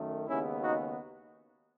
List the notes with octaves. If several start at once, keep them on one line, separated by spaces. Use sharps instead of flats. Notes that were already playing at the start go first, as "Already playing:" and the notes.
Already playing: F#2 D#3 A3
D#2 C#3 G#3 B3 C#4 E4
D#4 F#4